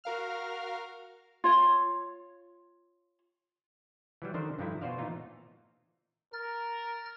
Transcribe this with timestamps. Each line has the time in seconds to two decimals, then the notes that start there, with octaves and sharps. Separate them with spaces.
0.04 F#4 A#4 F5 F6
1.44 F4 C#5
4.22 E3 F#3 G3
4.34 D3 D#3 D4 C5
4.59 G2 D3 F3 D#4 E4
4.81 B2 F4 F#4 C5 D5 F5
4.98 A#2 E3 D#4 F4
6.33 A#4 F6 A6